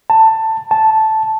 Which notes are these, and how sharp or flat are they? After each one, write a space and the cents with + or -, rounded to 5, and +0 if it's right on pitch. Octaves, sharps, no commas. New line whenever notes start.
A5 +15
A5 -5